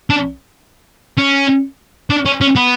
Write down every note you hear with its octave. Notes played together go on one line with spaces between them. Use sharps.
D4
C#4
D4
C#4
C#4
B3